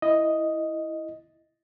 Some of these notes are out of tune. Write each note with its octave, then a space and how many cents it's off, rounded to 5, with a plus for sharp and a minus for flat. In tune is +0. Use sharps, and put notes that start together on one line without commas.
E4 +0 D#5 +0